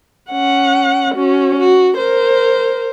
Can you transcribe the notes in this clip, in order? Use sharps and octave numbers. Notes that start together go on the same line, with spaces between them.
C#4 F#5
C#4 F#4
F#4
A#4 C5